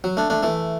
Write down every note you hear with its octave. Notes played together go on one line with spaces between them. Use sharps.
F#3
A3 D4
A3 D4
E3 A3